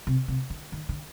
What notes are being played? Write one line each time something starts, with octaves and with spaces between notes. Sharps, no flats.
C3
C3
D3
D#3
D3